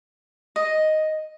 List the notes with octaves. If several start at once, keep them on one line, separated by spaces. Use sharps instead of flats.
D#5